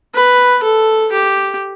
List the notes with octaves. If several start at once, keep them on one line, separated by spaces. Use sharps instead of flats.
B4
A4
G4